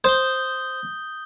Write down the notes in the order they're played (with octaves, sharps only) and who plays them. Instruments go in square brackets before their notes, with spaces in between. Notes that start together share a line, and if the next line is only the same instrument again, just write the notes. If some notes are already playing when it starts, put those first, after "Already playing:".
[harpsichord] C5 [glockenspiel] D#6 G6 G7